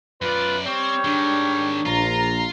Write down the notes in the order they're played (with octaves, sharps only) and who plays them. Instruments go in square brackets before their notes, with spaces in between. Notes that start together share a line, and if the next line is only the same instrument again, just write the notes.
[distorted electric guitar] F#2 D5 [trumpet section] F4 B4
[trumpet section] G3 C#5 [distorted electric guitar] C4
[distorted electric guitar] D#3 G#3 [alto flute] D4
[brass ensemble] A#1 A#5 [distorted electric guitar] F4